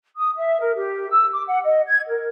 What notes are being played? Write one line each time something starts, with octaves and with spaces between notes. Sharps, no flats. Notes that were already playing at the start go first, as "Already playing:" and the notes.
D#6
E5
A#4
G4
E6
D6
F#5
D#5
G#6
A#4